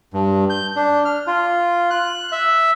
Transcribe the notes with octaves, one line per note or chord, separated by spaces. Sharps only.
G2
G6
D4
F6
F4
F#6
E5